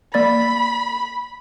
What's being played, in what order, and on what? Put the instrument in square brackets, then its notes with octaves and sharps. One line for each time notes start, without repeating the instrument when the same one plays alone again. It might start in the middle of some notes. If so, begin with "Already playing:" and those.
[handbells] A#3 D5 A6 [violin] B5